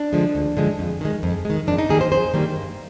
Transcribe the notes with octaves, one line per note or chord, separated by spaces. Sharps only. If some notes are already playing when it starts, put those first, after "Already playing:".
Already playing: D4
D3 F3 G#3
D2
D3 F3 G#3
F2
D#3 G#3
F2
D#3 G#3
F2 D4
D#4
D#3 G3 A#3 G#4
C5
F2 C5
D#3 G3 A#3
G2